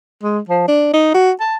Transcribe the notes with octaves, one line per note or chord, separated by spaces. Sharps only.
G#3
F3
D4
D#4
F#4
A5